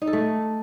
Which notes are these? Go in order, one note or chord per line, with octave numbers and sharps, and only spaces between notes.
D#4
A4
A3